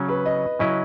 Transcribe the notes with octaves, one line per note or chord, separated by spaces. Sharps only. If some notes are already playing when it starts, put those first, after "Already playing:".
Already playing: C#3 F#3 C#4
B4
D#5
C#3 F#3 C#4 E4 B4 D#5